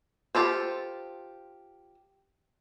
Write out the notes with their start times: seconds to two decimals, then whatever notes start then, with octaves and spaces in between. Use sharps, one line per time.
0.35 F4 G4 A4 C5